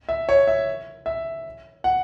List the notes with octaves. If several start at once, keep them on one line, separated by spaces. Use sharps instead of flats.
E5
C#5
E5
E5
F#5